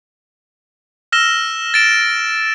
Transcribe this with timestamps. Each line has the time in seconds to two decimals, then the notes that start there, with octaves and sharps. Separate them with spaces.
1.12 E6 F6 A#6 E7 G7
1.74 A6 D7 E7